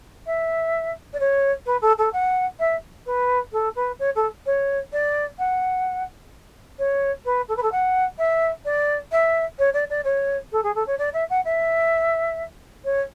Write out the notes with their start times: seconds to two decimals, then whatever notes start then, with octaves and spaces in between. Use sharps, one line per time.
0.26 E5
1.13 D5
1.19 C#5
1.65 B4
1.81 A4
1.98 A4
2.12 F#5
2.59 E5
3.06 B4
3.52 A4
3.75 B4
3.99 C#5
4.15 A4
4.45 C#5
4.92 D5
5.38 F#5
6.78 C#5
7.25 B4
7.48 A4
7.56 B4
7.62 A4
7.71 F#5
8.18 E5
8.64 D5
9.11 E5
9.58 C#5
9.73 D5
9.90 D5
10.04 C#5
10.52 A4
10.63 G#4
10.75 A4
10.86 C#5
10.98 D5
11.13 E5
11.29 F#5
11.44 E5
12.84 C#5